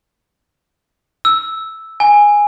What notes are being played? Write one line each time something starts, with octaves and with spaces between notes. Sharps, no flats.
E6
G#5